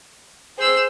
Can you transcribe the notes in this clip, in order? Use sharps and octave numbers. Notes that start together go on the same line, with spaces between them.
G#4 C5 E6